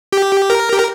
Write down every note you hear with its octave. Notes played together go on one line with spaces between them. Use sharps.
G4
A#4
G4
A#4